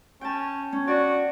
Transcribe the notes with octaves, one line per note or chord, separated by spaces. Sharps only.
C#4 G5 A5
C#4
F#4 D5